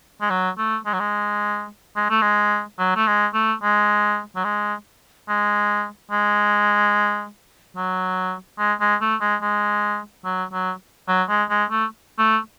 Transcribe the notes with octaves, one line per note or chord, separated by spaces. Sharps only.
G#3
F#3
A3
G#3
F#3
G#3
G#3
A3
G#3
F#3
A3
G#3
A3
G#3
F#3
G#3
G#3
G#3
F#3
G#3
G#3
A3
G#3
G#3
F#3
F#3
F#3
G#3
G#3
A3
A3